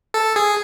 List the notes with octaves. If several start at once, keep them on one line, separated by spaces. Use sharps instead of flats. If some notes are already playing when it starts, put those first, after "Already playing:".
A4
G#4